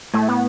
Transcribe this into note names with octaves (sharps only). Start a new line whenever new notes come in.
A2 A3
B3